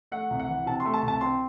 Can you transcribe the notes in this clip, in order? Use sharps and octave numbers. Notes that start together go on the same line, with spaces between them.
A3 F#5
C2
F#5
E3
C3 A5
C6
A3
A5
C2
A5
C4 C6